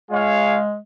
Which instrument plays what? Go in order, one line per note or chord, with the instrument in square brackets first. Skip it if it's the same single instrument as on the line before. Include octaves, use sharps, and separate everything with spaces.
[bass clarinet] G#3 [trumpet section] F4 G#4 C#5 F5